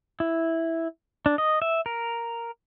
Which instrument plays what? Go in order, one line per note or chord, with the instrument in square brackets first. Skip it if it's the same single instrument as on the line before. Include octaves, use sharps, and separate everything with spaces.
[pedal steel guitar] E4
D4
D#5
E5
A#4